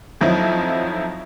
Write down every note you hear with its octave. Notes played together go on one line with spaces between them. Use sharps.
F2 F3 F#3 D#4 E4